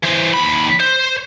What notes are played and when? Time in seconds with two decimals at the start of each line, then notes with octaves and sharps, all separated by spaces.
0.03 E3 C5
0.34 D#2 B5
0.80 C5